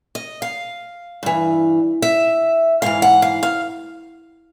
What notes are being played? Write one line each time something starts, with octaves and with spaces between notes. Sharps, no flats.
D#5
F5
G2 E3
E5
G#2 E3 F5
F#5
F5
F5